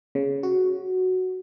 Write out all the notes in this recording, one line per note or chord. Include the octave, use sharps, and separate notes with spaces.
C#3
F#4